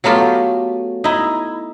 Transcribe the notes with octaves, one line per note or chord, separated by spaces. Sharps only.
F#3 A3 B3 F4 G4
D#4 E4